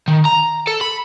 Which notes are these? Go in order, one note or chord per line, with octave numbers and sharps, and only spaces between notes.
D#3
A#5
A4
B5